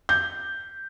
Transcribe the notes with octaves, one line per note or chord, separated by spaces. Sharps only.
G6